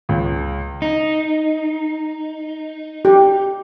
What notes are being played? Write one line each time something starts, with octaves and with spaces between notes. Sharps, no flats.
C#2
D#4
G4